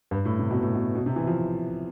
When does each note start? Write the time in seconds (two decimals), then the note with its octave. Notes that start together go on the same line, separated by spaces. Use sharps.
0.11 G2
0.25 A2
0.39 C3
0.51 B2
0.63 A2
0.74 B2
0.96 B2
1.06 C3
1.16 E3
1.27 F3